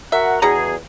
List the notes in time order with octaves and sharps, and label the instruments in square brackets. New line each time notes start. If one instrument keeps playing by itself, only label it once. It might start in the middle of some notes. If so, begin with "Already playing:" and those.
[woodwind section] F#4 A#4 F#5 [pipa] E5
[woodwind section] E2 G#4 [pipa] B2 F#5 A#5